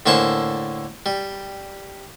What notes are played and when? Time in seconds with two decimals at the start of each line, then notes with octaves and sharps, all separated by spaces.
0.06 A2 D3 A#3 C5 G#5 A5
1.06 G3